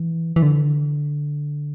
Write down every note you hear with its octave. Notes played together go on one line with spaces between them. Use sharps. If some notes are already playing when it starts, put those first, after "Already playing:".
Already playing: E3
E3
D3